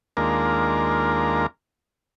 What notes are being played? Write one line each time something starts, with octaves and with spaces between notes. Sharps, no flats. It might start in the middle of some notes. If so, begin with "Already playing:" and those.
D#2 G#3 A#3 D4 F4 A#4